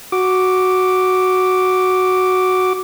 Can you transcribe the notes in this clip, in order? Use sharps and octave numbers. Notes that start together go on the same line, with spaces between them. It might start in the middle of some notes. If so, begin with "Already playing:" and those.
F#4 D6